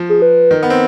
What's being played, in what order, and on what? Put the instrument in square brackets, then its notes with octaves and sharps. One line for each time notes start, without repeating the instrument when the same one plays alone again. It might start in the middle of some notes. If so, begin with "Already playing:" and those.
Already playing: [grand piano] F3
[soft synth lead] G#4
B4
[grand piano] D#3
B3
C4